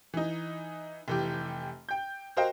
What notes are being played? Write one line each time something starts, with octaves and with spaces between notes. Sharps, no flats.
E3 D#4
F1 E3 G4
G5 G6
F#4 A#4 C5 D#5 F5 G5